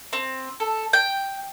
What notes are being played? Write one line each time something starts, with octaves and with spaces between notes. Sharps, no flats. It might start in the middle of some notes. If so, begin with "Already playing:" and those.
C4
A4
G5